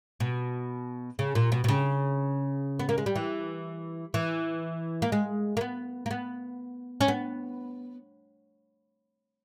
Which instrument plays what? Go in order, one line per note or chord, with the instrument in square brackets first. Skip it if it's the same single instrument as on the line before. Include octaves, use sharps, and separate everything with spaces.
[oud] B2
C#3
A#2
B2
B2
C#3
B3
A#3
G#3
G3
E3
E3
A#3
G#3
A#3
B3
A#3
B3
C#4
B3